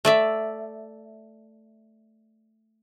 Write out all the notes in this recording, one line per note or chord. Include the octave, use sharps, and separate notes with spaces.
A3 D5 E5